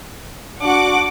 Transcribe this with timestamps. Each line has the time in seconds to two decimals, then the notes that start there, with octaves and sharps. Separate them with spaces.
0.61 D4 F#4 F#5 D6